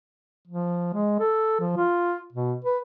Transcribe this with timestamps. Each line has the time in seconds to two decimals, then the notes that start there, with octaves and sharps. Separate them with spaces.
0.47 F3
0.94 G#3
1.20 A4
1.60 F3
1.77 F4
2.33 B2
2.65 B4